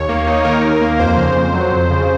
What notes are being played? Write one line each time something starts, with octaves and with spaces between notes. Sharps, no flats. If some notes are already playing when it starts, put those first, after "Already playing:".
Already playing: D#2 C#5
A#3
D#4
D#3 A#4
D#2
A#3
F2 C5
C#3
F2
F#3
F2
C#3